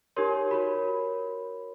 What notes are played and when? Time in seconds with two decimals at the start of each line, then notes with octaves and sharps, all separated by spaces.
0.16 D#4 G4 A#4 C#5 C6
0.51 F#4 A#4 C#5 B5